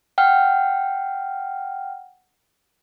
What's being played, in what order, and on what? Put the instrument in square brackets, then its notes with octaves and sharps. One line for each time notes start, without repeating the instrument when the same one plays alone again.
[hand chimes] F#5 G5 F6